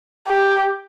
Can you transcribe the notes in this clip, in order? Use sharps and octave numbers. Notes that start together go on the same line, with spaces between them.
G4